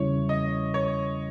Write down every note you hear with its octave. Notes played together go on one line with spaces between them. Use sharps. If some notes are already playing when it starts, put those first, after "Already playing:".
Already playing: E2 C#3 G3 C#4 E4 C#5
D#5
C#5